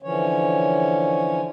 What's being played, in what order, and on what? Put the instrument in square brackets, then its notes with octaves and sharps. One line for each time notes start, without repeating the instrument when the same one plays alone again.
[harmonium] D3 E3 F3 C#4 C#5